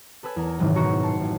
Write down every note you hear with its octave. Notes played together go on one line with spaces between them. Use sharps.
A4 B4 G#5 E6 G#6
E2 A#4
F#1 G#2 C3 D#3 E3
B2 F#4 A#5 C#6 C7 C#7
A5 C6 C7 C#7
A1